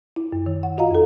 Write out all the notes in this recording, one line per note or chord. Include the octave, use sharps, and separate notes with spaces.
E4
F#2
D#3
F#5
F4 F#4 D#5 F5 A#5
F2 A4